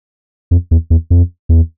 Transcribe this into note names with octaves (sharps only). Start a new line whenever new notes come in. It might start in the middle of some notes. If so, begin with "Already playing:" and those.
F2
E2
E2
F2
E2